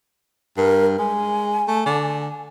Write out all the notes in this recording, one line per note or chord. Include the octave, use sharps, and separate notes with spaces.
G2 A#4
G#3 G#5
A3
D3